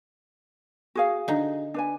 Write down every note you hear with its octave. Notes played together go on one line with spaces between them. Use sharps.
F#4 G#4 F5
D3 D#4
D4 B4 G#5